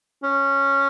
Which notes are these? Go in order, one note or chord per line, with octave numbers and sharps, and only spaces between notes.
C#4